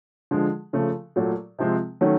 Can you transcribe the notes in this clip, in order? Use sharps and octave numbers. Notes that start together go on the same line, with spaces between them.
D3 F3 G#3
C#3 F3 A3
A#2 F#3 A3
C3 F3 G#3 C4
D#3 F#3 A3 C#4